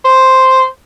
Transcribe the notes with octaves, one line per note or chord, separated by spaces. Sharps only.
C5